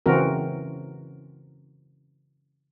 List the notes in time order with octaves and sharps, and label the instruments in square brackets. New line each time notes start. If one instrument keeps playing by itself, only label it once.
[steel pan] C#3 E3 C4 F#4 A#4